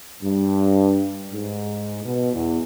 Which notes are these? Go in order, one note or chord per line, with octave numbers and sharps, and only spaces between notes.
G2
G#2
B2
E2